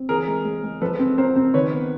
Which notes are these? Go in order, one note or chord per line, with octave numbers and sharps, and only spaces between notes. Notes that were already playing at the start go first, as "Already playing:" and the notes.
Already playing: C4
E3 G#4 A#4
G#3
G#3
G#3
F3 A4 B4
C4
C4 A#4 C5
C4
D#3 B4 C#5
B3